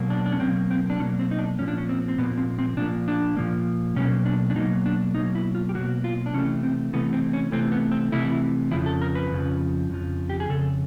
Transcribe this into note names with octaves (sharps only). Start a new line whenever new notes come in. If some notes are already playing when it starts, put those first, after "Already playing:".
Already playing: B2 F#3 A#3
D4
D4
C#4
B2 F#3 A#3 C4
C4
D4
B2 F#3 A#3 C#4
C4
D#4
D4
A#2 F3 A#3 C#4
D4
C#4
C4
C4
A#2 F3 A#3 B3
C4
C4
A#2 F3 A#3 D4
D4
A#2 F3 A#3
B2 F#3 A#3 C#4
D4
D4
B2 F#3 A#3 D#4
D4
B2 F#3 A#3 D#4
E4
F4
G4
B2 F#3 A#3 F#4
F4
D4
C3 E3 A3 C#4
C4
C3 E3 A3 B3
C4
C#4
C3 E3 A3 C4
B3
C4
C3 E3 A3 E4
F2 C#3 F3 E4
A4
A#4
B4
F2 C#3 F3
F2 C#3 F3
G4
G#4
F2 C#3 A4